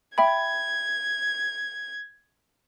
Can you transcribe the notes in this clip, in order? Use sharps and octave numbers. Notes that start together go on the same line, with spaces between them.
E5 G5 B5 G#6